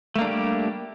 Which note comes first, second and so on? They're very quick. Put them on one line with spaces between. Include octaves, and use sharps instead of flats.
A3 A#3 D4 G3 G4